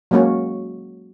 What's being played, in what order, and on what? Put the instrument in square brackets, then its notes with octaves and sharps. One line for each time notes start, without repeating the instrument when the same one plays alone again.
[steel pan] F#3 G#3 A#3 C#4 F#4